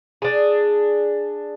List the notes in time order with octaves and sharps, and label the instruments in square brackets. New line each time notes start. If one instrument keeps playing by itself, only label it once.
[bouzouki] D4 G#4